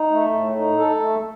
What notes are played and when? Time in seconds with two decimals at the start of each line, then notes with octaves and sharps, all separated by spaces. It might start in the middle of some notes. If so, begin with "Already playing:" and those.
Already playing: D#4
0.11 A3
0.32 A2
0.55 D#4
0.78 A4
1.01 A3